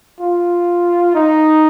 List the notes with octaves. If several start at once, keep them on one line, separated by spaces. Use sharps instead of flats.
F4
D#4